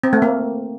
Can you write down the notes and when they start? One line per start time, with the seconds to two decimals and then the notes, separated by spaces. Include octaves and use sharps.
0.03 C4
0.13 A3
0.22 A#3